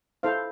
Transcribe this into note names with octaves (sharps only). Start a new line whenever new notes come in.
E4 A4 C5 F5